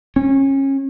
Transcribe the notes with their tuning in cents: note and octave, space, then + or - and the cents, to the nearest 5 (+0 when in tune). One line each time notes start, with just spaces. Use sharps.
C#4 -25